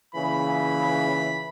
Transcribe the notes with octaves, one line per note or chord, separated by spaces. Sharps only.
A#2 C#3 E3 B5